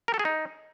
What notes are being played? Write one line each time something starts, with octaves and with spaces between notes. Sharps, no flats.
A#4
A4
G#4
D#4